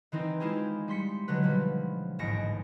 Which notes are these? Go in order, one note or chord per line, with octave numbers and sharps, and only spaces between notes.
D#3 E3 C4 D#4
G#3 E4 F4 G4 G#4
G3 C6 B6 C#7
D3 D#3 F#3 B4
B2 F3 G3
A1 D#2 G#2 A#6 C#7 D7